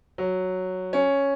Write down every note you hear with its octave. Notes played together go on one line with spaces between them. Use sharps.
F#3
C#4